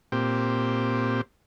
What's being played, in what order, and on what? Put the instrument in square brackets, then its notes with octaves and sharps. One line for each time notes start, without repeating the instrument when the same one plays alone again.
[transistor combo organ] A#2 C4 G4